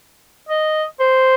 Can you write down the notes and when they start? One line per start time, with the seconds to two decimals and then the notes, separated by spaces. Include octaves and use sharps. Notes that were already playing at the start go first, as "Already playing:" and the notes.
0.49 D#5
1.00 C5